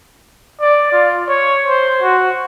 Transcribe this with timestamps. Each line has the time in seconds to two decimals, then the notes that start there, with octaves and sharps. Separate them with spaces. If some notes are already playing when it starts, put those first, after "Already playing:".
0.61 D5
0.92 F4
1.29 C#5
1.66 C5
2.02 F#4